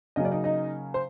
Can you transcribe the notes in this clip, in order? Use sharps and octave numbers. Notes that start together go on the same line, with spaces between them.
C#3 F#3 A#3 C#4 D#5
D5
D#4 D#5
D#4 D#5
C5